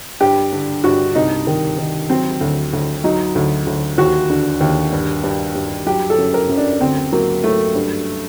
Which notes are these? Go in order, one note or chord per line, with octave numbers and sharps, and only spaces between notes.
G2 G4
D3
G2 F#4
C2 D#4
D#3
D#3
F#3 C4
D2
D2
F#3 D#4
D2
D2
D#2 F#4
D3
D#2
G2
G2
G2
F#3 G4
A4
F#2
A#4
F#2
D4
D2 C4
F#3 A#3
F#3 A3
G2